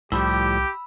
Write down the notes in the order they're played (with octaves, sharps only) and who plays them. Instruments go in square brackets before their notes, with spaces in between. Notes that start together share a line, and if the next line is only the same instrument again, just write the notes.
[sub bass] C2 [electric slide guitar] A2 F3 G3 [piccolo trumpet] G4 [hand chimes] B5 E6